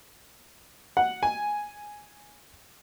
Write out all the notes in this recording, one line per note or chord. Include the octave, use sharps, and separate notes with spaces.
F#5
G#5